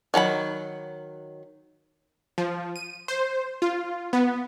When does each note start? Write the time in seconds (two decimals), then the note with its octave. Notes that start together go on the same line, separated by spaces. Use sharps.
0.14 D#3 F#3 A#5 B5
2.38 F3
2.76 D#7
3.08 C5
3.62 F4
4.13 B3